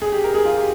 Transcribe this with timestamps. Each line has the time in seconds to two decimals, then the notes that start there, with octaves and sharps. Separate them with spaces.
0.02 G#4
0.12 G4
0.24 A#4
0.34 G#4
0.45 F4
0.57 G4